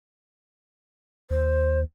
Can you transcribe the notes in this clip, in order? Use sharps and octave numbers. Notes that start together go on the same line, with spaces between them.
D#2 C5